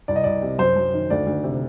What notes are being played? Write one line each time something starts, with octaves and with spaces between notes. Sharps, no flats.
C2 D5
D#5
C2 D5
C3
F#2 C5
F#2
D#3
D2 D5
D2
C3